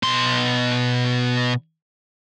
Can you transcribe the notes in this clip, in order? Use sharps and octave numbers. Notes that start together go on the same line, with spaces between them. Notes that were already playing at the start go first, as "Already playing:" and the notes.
B2 C6